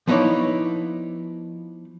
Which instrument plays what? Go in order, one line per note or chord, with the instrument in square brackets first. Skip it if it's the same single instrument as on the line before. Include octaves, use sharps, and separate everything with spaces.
[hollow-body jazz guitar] F3 B3 D#4 E4 C#5 D5